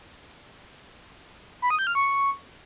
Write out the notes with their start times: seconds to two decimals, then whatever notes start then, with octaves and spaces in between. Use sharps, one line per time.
1.62 B5
1.70 D#6
1.79 G6
1.87 F6
1.95 C#6